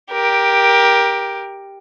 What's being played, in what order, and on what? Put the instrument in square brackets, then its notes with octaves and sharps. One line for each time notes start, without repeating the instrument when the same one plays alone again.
[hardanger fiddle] G4 A#4